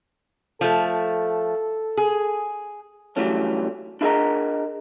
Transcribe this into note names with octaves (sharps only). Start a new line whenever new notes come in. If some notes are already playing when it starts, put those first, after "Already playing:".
F3 A3 A4
G#4
E3 F#3 G3 A3 C#4 D4
D4 E4 G#4 A#4 D#5 A#5